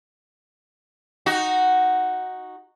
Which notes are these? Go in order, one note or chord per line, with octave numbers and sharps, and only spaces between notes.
D#4 F#4